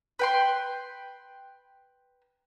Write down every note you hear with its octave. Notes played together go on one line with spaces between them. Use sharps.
B4 G5 C6